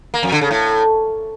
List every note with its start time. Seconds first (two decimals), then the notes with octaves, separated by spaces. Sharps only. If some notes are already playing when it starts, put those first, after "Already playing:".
0.14 A#3
0.23 F2
0.32 D3
0.41 C#3
0.51 A2